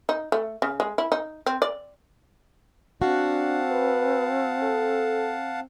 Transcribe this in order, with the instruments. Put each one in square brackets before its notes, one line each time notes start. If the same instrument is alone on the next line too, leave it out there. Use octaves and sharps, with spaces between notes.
[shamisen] D#4
A3
C#3
G#3
E4
D#4
C4
D5
[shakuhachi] C4 [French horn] D4 [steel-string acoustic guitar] F#4 [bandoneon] F5 F#5 A5
[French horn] B4
A4